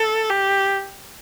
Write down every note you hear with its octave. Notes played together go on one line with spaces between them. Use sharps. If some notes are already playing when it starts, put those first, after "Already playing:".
Already playing: A4
G4